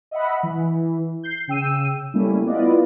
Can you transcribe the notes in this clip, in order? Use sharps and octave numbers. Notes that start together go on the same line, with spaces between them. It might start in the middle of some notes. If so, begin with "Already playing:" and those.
D#5 E5 F#5 B5
E3
G6 C7
C#3 G5 E6 D#7
G3 A3 A#3 C#4 E4
B3 E4 F4 B4 D5 D#5